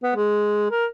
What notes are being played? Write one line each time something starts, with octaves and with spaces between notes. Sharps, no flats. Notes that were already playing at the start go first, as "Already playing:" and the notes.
B3
G#3
A#4